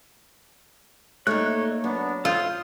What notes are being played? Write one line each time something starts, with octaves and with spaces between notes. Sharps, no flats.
A3 A#3 D#4 C#5 D5 F#6
F#3 B3 D4
F4 A4 C5 D#6